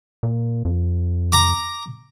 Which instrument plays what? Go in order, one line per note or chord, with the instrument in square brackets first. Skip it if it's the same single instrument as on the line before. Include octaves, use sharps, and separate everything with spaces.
[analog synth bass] A#2
F2
[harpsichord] A#5 D6